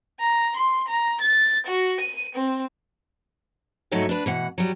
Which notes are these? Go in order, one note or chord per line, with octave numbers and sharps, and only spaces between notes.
A#5
C6
A#5
A6
F#4
D#7
C4
G#2 F#3 A3 D#4 C#5 E5
D4 B4
B2 E3 F#5
F#3 G3